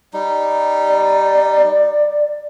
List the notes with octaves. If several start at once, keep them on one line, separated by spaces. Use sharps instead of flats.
G3 D#4
D5